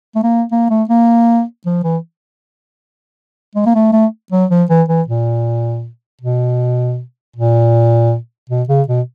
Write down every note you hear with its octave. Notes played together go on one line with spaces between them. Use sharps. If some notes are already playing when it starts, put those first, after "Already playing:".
A3
A#3
A#3
A3
A#3
F3
E3
G#3
A#3
A3
A3
F#3
F3
E3
E3
A#2
B2
A#2
B2
C#3
B2